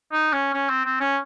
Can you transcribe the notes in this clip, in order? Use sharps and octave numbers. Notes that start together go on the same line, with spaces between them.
D#4
C#4
C#4
C4
C4
C#4